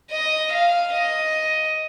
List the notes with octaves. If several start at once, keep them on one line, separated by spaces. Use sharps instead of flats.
D#5
F5
D#5